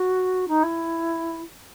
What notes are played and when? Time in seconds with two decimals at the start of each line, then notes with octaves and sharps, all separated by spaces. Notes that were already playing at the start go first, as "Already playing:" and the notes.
Already playing: F#4
0.48 D#4
0.63 E4